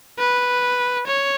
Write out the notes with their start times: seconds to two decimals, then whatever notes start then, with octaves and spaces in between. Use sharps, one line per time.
0.19 B4
1.07 C#5